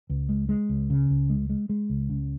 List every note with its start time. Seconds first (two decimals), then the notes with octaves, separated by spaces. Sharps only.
0.10 C#2
0.29 G#3
0.49 G#3
0.69 C#2
0.90 C#3
1.10 C#2
1.30 G#3
1.50 G#3
1.69 G#3
1.90 C#2
2.10 C#3